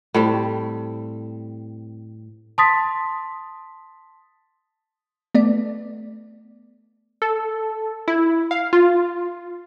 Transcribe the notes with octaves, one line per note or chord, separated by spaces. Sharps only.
A2 G3 C4
A5 C6 D#6 A6 B6
A3 B3 D5
A4
E4
F5
F4